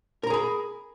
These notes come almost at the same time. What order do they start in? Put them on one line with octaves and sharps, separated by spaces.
A#4 A#5 G#4 B5